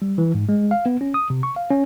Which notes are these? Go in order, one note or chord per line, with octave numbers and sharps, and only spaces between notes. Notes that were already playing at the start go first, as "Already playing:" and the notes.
G3
E3
G#2
G#3
F5
B3
C#4
D#6
C3
C#6
F5
C#4